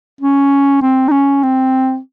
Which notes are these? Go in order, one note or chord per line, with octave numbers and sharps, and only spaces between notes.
C#4
C4
D#4
C#4
C4